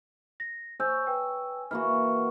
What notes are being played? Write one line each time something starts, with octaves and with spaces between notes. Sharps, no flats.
A#6
C5 C#5 G#5 E6 G6
B4 G5 E6
E3 A#3 F#4 F6